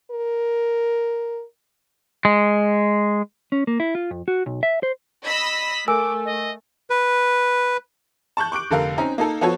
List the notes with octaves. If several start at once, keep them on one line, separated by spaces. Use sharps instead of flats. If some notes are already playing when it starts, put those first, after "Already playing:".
A#4
G#3
C#4
A#3
E4
F4
F2
F#4
B1
E5
C5
D#5 B5 E6 B6
A3 A#4 G#5 D6 E6
D#5
B4
A5 C#6 F#6 G6
C#6 D6 F#6 D7
F1 D3 A4 A#4 F5
C4 C#4 D#4 A#5
A#3 D#4 A4 A#4
F3 B3 F#4 A4 C#5